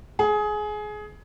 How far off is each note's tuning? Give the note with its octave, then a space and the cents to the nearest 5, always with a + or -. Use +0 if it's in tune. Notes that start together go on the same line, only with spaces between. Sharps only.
G#4 +20